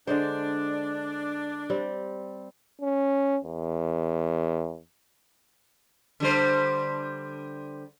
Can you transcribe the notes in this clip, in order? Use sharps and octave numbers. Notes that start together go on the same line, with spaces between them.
D3 G#3 D4 C5
G3 C4
C#4
E2
D3 G3 C5